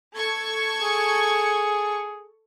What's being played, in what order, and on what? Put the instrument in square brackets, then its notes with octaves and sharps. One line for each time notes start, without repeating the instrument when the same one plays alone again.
[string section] A4 C#6 G#6
[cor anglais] G#4